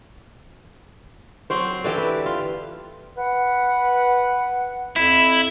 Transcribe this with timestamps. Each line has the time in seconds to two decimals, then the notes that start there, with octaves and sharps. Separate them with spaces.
1.50 F#3 C4 F#4 C5
1.84 D3 E3 G4
1.98 B4
2.26 F4
3.17 B4 F#5
4.96 F2 E4